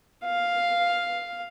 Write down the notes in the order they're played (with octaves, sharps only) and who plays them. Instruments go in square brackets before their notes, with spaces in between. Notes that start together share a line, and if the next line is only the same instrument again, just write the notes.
[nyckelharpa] F5